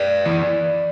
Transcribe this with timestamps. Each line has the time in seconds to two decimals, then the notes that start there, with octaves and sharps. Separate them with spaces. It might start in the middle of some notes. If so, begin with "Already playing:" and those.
Already playing: B4 D5
0.26 E3